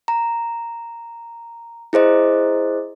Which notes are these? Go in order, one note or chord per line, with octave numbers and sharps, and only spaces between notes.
A#5
E4 G#4 C5 D#5